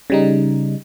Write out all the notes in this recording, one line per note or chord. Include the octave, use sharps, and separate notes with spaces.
C#3 G3 D#4